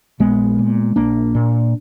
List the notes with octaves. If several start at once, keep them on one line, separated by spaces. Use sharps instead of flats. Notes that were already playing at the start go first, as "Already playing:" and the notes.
A#1 G#3 B3
A#2
A#1 A#3 D4
A#2